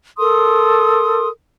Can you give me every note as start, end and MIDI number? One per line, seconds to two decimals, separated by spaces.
0.18 1.27 69
0.18 1.27 70
0.18 1.27 84
0.18 1.27 87